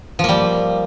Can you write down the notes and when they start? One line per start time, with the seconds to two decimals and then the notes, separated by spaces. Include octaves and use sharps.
0.19 F3
0.24 A#3
0.29 G3